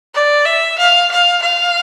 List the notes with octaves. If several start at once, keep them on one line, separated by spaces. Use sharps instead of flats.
D5
E5
F5
F5
F5